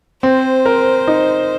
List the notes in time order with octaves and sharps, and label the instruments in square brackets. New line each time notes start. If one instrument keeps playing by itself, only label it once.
[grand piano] C4 [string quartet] C5
[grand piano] A#4
D#4